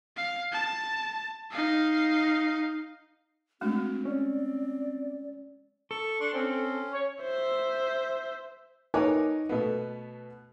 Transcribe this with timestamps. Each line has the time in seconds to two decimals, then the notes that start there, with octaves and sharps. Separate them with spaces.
0.17 F5
0.52 A5
1.51 D#4 F5
3.61 G#3 A3 C4 D4 F#4
4.05 C#4 D5
5.91 A4 C#6
6.20 D4 C6 C#6
6.34 C4 C#4
6.93 C#5
7.22 C5 E5
8.94 D#4 A#4 B4 C#5 G#5 D6
9.49 B2 A3 B3